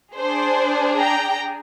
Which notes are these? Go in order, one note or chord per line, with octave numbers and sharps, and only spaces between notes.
D4 G#4 C5
G5 A#5